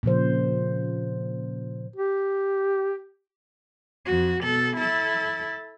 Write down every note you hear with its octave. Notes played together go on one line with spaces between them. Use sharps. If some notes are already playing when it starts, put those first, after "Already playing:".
A#2 C#3 F3 C5
G4
F2 F#4
B2 A4
E4 A4